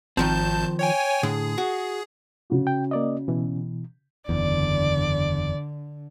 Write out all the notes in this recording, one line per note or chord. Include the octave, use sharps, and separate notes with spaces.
G#1 D#3 F3 C4 A5 G6
C#5 G5 G#5
A2 D3 G#4
F#4
C#3 F#4
G5
A#3 D5 D#5
B2 E3
F#1 E2 D3 D5